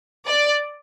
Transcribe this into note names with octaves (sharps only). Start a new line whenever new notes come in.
D5